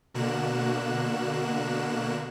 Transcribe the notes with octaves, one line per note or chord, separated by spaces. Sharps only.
B2 D3 A#3 F#4 F#6 E7